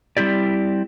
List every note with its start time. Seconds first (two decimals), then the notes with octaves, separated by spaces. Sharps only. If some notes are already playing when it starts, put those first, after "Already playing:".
0.17 G3 C4 E4 G4 D5